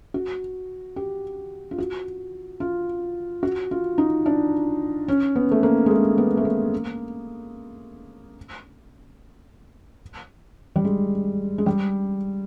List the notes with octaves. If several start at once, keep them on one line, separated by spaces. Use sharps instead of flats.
F#4
G4
F4
F#4
F4
F#4
F4
D#4
D4
C#4
B3
A3
A#3
G#3
A3
B3
A3
A#3
G3
G#3
G#3
G3